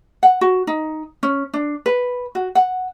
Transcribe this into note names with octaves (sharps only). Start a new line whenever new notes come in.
F#5
F#4
D#4
C#4
D4
B4
F#4
F#5